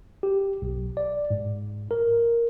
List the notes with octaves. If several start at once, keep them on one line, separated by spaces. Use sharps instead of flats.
G4
B1
D5
G#2
A#4